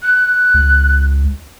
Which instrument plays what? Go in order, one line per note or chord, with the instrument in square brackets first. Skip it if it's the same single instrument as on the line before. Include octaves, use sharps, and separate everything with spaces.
[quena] F#6
[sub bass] C#2